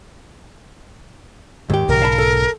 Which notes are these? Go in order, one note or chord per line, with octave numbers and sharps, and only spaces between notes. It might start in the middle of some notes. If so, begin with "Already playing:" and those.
D#2 G#2 D#3 G4
B1 G#2 C#3 A#4
F5 A5 B5
A4